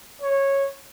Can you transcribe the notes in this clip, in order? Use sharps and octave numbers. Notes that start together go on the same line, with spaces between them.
C#5